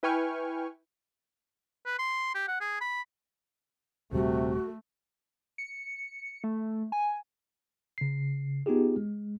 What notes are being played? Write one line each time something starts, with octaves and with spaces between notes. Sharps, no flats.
E4 B4 G5 G#5 C#6 F6
B4
C6
G4
F#5
G#4
B5
D#1 C3 G3 A3 F#4
C#7
A3
G#5
C#3 C7
B3 D#4 F4 G4 G#4
G#3